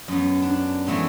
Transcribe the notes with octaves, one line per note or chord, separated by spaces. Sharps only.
F#2 B3
D4
E3 G#3 A3 B3 C4